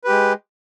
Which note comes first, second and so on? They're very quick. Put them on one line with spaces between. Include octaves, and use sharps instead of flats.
B4 G4 G#3